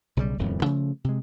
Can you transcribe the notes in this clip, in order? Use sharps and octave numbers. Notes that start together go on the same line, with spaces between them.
B1 C#3 E3 G3
D#1 F2 A2 C#3
C#3 F3 A3
C3 G#3